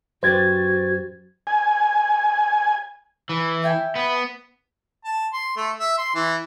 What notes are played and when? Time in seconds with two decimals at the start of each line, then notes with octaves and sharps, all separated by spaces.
0.23 F#2 F#4 G4 B4 C5 G#6 A6
1.47 G#5
3.29 E3
3.62 E5 G5 G#5
3.95 B3
5.04 A5
5.33 C6
5.57 A3
5.79 E5
5.98 C6
6.15 E3